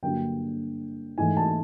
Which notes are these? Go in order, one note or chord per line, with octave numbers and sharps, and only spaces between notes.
G2 D3 F#3 A#3 G5
G#2 E3 A3 G#5
A5